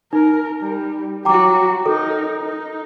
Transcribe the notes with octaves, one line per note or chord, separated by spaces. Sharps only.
D#4 A#4
G3
F#3 F#4 G5 A#5 D6
D#4 A4 A#4
D#4